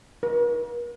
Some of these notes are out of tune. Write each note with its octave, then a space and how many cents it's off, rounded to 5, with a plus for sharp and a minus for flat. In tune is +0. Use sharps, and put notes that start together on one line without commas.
A#4 +45